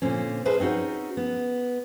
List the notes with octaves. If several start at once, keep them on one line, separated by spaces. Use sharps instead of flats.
A#2 D3 C4 C#4
G#4 B4 C5 E5 A5
C4 C#4 D#4 F#4
B3